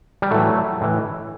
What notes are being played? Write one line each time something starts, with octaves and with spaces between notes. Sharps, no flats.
G3
A2 E3 F#3 A3
A2 E3